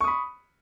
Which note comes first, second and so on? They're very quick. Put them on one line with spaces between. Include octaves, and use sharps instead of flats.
C#6 D#6 B5